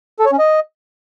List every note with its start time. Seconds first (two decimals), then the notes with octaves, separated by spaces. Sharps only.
0.19 A4
0.26 C#5
0.32 C#4
0.39 D#5